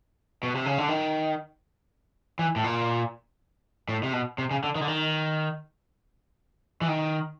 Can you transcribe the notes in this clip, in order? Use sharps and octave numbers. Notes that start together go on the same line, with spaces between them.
B2
C3
C#3
D3
D#3
E3
A2
A#2
A2
C3
B2
C3
C#3
D3
D#3
D3
D#3
E3
D#3